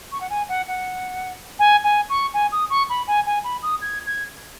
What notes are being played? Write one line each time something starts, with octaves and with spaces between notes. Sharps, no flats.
C#6
F#5
G#5
F#5
F#5
G#5
G#5
C#6
G#5
D#6
C#6
B5
G#5
G#5
B5
D#6
G#6
G#6